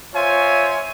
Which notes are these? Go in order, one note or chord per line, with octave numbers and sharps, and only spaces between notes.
F4 C5 C#5 E5 G#5